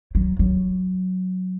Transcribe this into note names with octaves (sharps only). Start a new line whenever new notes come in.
F#3
F#3